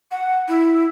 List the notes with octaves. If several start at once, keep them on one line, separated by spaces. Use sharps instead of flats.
F#5
E4